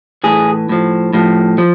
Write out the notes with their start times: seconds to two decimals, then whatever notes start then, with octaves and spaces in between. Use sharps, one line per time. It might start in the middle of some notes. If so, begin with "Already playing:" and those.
0.24 A2 E3 G#4
0.69 A2 F3
1.13 A2 F3
1.58 F3